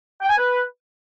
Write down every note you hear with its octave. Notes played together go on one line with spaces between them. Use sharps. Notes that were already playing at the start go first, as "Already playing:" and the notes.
G5
G#5
B4